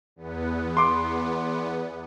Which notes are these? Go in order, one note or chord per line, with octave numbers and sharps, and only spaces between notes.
E2 B3
C6 D6